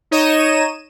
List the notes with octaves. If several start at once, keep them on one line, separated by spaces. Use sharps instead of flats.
D#4 C#5 D#5 D#7 E7